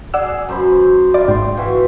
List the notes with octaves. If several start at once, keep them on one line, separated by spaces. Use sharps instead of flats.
G#4 D5 F#5 E6
F#2 C5 B5
F4 D5 E5
G#1 G#2 G5 C6
E3 F#4 E5